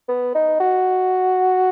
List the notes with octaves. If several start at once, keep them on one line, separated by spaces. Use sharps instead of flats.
B3
D#4
F#4